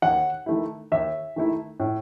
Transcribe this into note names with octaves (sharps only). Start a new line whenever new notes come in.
D#2 F#5
D#3 A3 E4
D#2 E5
D#3 A3 E4
A2